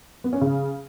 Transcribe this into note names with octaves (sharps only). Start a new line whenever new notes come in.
B3
C#4
C#3